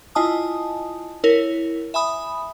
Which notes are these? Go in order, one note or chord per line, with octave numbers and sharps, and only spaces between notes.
E4 F4 D#5 G#5 A5 D#6
E4 A#4 C#5
E5 G#5 B5 D#6